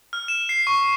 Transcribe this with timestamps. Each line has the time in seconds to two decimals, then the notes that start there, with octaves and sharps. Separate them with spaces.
0.13 F6
0.28 E7
0.49 C7
0.67 C#6